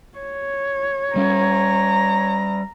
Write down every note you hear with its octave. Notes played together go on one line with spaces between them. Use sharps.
C#5
G3 C#4 A#5